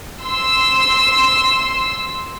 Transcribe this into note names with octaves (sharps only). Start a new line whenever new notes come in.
C6 E6